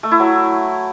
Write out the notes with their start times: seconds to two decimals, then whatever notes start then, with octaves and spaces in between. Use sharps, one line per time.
0.03 A3
0.11 E4
0.20 F#3